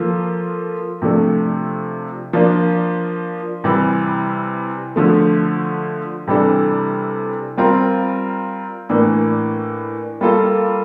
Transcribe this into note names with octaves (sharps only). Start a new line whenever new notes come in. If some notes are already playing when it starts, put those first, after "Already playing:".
Already playing: F3 A#3 F4 A4
C3 F3 A3 D4
F3 A#3 D4 F4
C3 E3 G3
D3 F3 A3
C3 E3 G3 D4 A4
G3 C4 F4 A#4
A2 E3 A#3 D4
G3 A#3 F4 A4